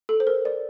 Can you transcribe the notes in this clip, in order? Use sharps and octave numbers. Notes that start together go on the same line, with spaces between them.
A4
C5
A#4
D5